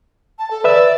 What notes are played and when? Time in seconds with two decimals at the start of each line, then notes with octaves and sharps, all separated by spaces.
0.39 A5
0.51 A4
0.64 B4 D5 E5 E6